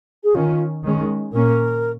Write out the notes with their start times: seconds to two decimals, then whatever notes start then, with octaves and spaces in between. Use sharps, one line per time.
0.24 G#4
0.35 D#3 C#4 F4
0.84 D#3 G#3 C#4
1.33 A#2 A#3 C#4 A#4